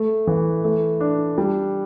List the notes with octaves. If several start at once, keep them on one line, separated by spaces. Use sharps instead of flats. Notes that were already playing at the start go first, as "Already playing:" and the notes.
Already playing: A3
E3
A3
D4
G3